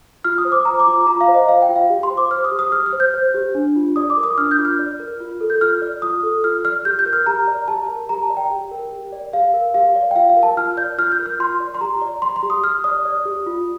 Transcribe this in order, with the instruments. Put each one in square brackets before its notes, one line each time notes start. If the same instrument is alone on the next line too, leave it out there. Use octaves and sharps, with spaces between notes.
[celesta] F4 F6
D#6
C5
D6
C5 A#5
D6
F4
D6
F4 A#5
F5
C5
D#5
C5 F5
G5
F4
F5
G4
C6
C5
D6
C5 F6
D#6
G4
D#6
G4 F6
F6
C5
G6
C5
G4
D4
F4
D5 D#6
D6
A#4
D#6
D4 F6
G6
F4
F6
D5
A#4
F4
A4
G6
F4 F6
D5
F4 D#6
A4
F4 F6
D5 F6
G4 G6
G6
A#4
F6
G4 A#5
D5
G4 A5
A#4
G4 A#5
A5
D5
G5
G4
A#4
G4
D5
G4 F5
A#4
G4 F5
D5
G5
F4 F5
F5
A#4
A5
F4 F6
D5 G6
F4 F6
G6
A#4
F6
F4 C6
D5
C6
G4 A#5
D5
D5 C6
C6
G4
D#6
G4 F6
D5 D#6
D5
G4
F4